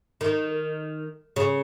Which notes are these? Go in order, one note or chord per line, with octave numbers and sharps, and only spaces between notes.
D#3
C#3